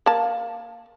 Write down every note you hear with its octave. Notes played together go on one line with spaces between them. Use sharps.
A#3 A5